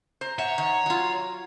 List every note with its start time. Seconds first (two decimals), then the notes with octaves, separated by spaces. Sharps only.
0.21 C5 A#5
0.39 C#5 E5 F#5
0.58 D#3
0.86 F#3 F4